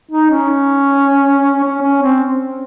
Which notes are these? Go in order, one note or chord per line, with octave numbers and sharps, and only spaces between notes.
D#4
C#4
C#4
C#4
C4